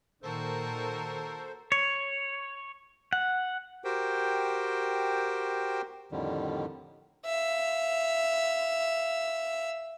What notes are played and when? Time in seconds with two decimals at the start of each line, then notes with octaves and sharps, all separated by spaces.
0.23 A#2 D#3 F#4 A4 A#4 C5
1.72 C#5
3.13 F#5
3.84 F#4 G4 A#4 C5 G5
6.12 F2 A2 D3 D#3 G3
7.26 E5 F5